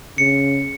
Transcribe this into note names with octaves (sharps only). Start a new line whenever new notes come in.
C#3 C#7